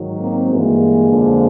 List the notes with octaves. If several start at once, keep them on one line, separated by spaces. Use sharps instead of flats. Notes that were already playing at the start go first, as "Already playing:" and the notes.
Already playing: G#2 D#3 F#3
A#3 C4
G2 E3 G#3 A#3
F2 D3 F3